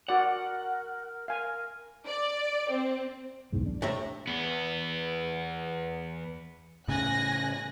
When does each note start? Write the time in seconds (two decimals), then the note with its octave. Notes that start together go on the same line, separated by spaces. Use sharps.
0.09 F#4 A#4 D5 F#5
1.28 A#4 F5 G#5
2.06 D5
2.70 C4
3.53 B1 E2 G#2
3.66 D4
3.82 A2 C3 E5
4.27 E2 B3
6.88 A2 C#3 G#5 F#6 A#6